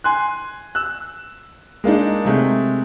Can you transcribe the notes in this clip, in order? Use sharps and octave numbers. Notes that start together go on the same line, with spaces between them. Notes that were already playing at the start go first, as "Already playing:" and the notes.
G#5 C6 F#6
E6 F#6
G#3 A#3 D4 D#4
C3 G#3 A3